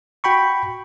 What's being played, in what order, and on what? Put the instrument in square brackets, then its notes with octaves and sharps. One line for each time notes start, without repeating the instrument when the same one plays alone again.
[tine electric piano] F#4 G5 B5 C#6